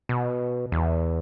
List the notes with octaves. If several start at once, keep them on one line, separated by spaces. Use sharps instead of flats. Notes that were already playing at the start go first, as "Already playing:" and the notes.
B2
E2